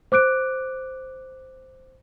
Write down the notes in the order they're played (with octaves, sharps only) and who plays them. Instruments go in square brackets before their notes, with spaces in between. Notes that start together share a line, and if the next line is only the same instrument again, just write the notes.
[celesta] C5 D6 F#6 D7